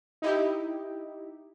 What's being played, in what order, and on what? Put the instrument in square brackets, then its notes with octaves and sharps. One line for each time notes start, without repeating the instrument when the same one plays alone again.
[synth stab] D#4 E4 G4